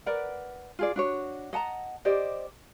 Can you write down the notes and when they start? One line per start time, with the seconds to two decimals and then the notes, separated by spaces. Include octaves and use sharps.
0.06 A#4 B4 D5 F#5
0.79 F4 G#4 D5
0.96 D4 F#4 C#5
1.53 D#5 F#5 A5 A#5
2.05 G4 C5 D5 D#5